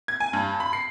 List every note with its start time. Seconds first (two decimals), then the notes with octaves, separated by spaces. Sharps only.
0.08 G#6
0.20 G#5
0.33 G2
0.60 B5
0.73 C7